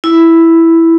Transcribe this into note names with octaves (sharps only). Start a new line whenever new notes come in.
E4